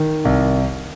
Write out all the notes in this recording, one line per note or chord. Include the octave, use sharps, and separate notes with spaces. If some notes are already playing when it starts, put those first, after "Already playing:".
Already playing: D#3
C2